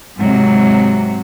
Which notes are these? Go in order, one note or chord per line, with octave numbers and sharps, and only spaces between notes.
G#2 C3 F#3